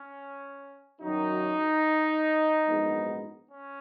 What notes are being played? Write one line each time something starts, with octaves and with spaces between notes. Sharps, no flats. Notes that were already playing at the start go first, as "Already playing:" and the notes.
Already playing: C#4
F#2 D#3 F#3 D#4
A#1 G#2 F#3 B3
C#4